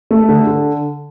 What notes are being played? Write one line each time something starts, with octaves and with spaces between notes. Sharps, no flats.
A3
D3
D3